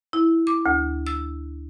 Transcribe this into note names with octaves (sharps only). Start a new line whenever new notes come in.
E4
D6
D2
E6